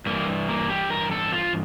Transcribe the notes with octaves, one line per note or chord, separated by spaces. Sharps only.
G2 E3 A#3
A#3
G4
A#4
A4
F4